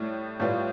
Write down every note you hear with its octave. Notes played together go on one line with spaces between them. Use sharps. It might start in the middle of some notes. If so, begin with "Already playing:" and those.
Already playing: A2 G3
A2 G3 B3 F4